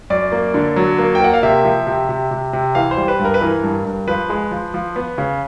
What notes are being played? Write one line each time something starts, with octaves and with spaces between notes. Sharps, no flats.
F#2 D5
A#3
D3
F#3
A#3
G5
A#3 F#5
F5
C3 E5
F3
C3
C3
C3
C3
E3 F5
C5
G3
B4
G2
A#4
B4
E3 A#4
G2
G2
F3 B4
G#3
F3
F3
B3
C#3